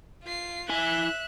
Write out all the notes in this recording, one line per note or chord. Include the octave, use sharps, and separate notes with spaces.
F4 C7
E4 E5 G#5 F#6